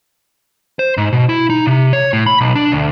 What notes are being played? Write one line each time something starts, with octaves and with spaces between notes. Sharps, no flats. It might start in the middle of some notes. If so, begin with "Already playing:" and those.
C5
G#2
B2
E4
D#4
C3
C#5
A2
B5
B1
D4
D2